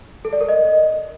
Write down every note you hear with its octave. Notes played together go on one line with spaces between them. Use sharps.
A4
D5
A#4
D#5